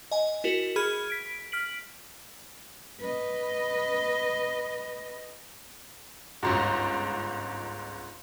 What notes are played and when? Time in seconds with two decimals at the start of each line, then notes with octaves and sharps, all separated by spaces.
0.11 D#5 G#5
0.44 E4 F#4 A#4
0.76 G#4 B5 F6 G#6
1.10 B6 D7
1.52 F6 B6 D7 F#7
3.00 B4 D#5
6.43 G1 C#2 G#2